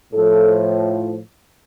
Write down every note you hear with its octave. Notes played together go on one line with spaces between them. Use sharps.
A2 F3 A4